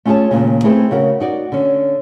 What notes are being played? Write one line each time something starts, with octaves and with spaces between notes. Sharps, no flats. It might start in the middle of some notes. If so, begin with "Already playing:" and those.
A3 C#4 F4 G#4 C#5 A5
D#2 A#2 C#3
A3 C4 E4 G#4 B4
C#3 F#4 A#4
D#4 F#4 D5
D3 C#4